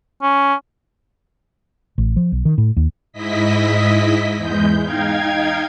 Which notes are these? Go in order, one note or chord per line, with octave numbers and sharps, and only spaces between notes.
C#4
A1
F3
B1
D#3
A2
D#2
G#2 E4 D#5 B6
E2 G#3 G6
D#4 F5 G5 G#6